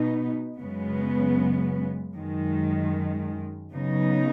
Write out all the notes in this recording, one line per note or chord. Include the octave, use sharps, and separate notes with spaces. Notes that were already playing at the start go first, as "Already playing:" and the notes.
Already playing: B2 B3 D#4
F#2 C#3 G#3 B3
F#2 D#3 G#3
C#3 F#3 B3 D#4